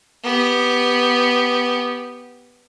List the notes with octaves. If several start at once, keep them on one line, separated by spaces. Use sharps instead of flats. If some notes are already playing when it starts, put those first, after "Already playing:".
B3 G4